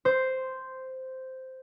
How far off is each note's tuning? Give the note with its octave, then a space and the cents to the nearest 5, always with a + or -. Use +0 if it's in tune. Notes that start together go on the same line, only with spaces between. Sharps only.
C5 -5